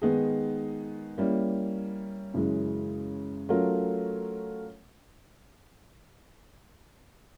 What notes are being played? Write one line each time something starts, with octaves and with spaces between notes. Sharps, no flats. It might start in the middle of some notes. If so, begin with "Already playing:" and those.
D#3 G#3 B3 D#4 G#4
G3 A#3 C#4 E4
F#2 C#3 E3 G#3
F#3 A3 C#4 F4 A#4